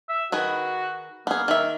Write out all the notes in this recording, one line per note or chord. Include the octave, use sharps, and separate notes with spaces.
E5
D#3 F#4 G#4 B4
A#3 B3 G#4
D#3 E5